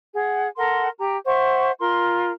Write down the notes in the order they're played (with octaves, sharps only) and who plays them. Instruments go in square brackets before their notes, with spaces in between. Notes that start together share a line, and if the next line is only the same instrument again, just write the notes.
[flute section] G#4 F#5
A4 A#4 F#5 C6
G4 A#5
C5 E5 F#5 C#6
F4 A#4 C6